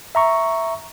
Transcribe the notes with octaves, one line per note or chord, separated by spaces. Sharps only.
E5 A#5 C#6